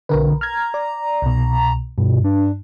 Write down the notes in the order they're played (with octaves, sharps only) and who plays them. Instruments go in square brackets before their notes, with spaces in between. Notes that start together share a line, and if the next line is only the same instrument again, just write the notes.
[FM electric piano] B1 A#4 B4 [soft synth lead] D3
[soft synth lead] A#5 [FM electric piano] F6 G#6
[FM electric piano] D5
C2 B2
[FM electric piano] G2 [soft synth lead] B2
[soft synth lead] D4